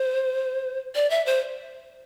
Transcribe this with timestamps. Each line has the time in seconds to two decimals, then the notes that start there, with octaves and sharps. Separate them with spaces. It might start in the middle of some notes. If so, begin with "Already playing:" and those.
Already playing: C5
0.95 D5
1.10 E5
1.26 C5